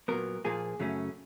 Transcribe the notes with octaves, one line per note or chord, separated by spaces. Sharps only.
A#2 F#3 B3 A#4
A#2 F3 A#3 G#4
F#2 C#3 F#3 A3 C#4